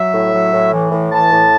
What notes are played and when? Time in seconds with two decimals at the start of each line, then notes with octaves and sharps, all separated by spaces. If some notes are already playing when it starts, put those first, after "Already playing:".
Already playing: F#3 E5
0.14 A2
0.33 F#3
0.53 A2
0.72 E3
0.92 A2
1.11 E3 A5
1.32 A2